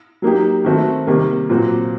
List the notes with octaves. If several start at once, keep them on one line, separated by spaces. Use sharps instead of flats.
F#3 A#3 D#4 G4
D#3 A3 C4 F#4
C3 D#3 G3 A#3
A#2 F#3 C4 F#4